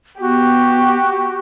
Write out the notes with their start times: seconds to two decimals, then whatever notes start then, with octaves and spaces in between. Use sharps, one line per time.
0.20 B3 F#4 G4